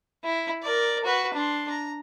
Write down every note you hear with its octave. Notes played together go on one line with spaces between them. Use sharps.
E4
A#4 D5
F#4 B4
D4 C6
A#5